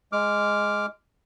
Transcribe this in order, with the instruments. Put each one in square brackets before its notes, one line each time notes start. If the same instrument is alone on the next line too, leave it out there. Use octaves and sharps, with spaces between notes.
[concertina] G#3 D6 F6